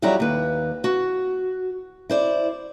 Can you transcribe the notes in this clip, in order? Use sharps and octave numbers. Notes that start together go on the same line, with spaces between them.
F2 F#3 G3 E4 F#4 A#5
D#2 B4
F#4
E4 C5 D5